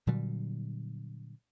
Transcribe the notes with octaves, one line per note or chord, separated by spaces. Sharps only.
A#2 D3 F#3 G3